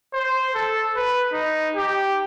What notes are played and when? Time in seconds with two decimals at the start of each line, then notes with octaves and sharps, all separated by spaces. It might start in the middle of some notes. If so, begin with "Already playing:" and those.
0.13 C5
0.55 A4
0.96 B4
1.33 D#4
1.75 G4